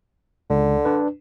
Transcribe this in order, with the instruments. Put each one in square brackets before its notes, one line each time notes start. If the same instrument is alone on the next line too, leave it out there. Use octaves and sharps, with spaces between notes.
[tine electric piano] C#2 [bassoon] D3
[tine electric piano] D4 B4